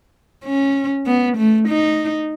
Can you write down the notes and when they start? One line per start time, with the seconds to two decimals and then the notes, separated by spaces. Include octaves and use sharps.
0.44 C#4
1.06 B3
1.37 A3
1.68 D#4